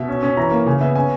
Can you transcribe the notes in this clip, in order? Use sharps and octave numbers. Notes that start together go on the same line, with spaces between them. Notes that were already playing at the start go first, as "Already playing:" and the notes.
Already playing: B2 E5
C#4
C#4
E3 A#5
A#3
C#3 G#5
B3 E5
C#4 G#5